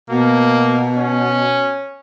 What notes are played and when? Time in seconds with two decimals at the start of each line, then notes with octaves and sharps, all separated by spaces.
0.10 B2 A#3
0.98 C#4